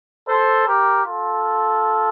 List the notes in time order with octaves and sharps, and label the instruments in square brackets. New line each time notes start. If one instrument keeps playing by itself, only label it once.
[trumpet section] A4 C5
G4 A#4
F4 A4